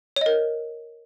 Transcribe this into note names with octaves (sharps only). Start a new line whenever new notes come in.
A#4 C#5 D#5